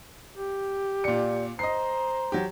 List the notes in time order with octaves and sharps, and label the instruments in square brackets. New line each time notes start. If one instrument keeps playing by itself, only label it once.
[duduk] G4
[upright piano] A#2 C#7 [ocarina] D5
[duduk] C5 [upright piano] D#5 C7 [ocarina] A#5
[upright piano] F#3 G4